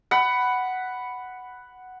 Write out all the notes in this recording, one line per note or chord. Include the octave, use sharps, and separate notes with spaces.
F#5 B5